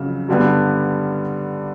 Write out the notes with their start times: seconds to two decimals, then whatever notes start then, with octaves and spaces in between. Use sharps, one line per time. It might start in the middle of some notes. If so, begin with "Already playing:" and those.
Already playing: F2 C#3 F#3
0.28 G2 D3 G3 B3